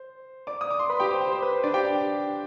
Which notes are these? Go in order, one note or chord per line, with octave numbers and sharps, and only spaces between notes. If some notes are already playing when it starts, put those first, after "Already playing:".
Already playing: C5
D5 D6
D#6
D6
C6
B4 B5
G4 G5
C5
C5
C5
B4
C5
D4 D5
G4 G5